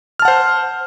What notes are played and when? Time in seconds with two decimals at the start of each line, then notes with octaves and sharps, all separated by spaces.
0.19 F6
0.22 A5
0.25 F#5
0.28 C5